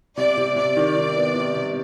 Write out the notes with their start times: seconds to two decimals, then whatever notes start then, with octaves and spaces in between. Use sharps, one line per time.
0.17 C3 D5
0.37 C3
0.56 C3 D5
0.77 D#3
0.96 D#3
1.16 B3
1.36 C3
1.56 C3